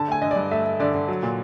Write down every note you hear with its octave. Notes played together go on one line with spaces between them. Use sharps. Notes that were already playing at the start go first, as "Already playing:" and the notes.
Already playing: D3 A5
A3 G#5
D3 D#5
G2 D5
A3 E5
A3
D3 D5
D3
F#3
A#2